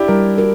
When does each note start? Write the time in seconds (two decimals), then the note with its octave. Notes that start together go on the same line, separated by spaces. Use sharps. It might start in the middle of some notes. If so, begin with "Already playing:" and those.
Already playing: D4 E4 G4
0.08 G3 A#4
0.38 F#4 A#4